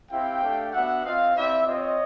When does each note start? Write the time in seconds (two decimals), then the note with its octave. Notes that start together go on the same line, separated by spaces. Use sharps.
0.11 C4 E4 G4 F5 G5
0.42 A3 D4 G4
0.73 B3 D4 F#4 E5 F#5
1.04 C4 F4 D#5 F5
1.35 C4 E4 G4 D5 E5
1.66 C4 F4 C#5 D#5